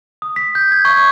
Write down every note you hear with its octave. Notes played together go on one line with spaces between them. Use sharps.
D#6
B6
G6
G#6
C#6
G#6